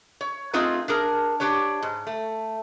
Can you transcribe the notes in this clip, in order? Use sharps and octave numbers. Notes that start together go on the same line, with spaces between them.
C#5
A3 C4 D#4 F4 G#4 B4
D4 G#4 A#4
D4 G4 B4 C#5
G#2
A3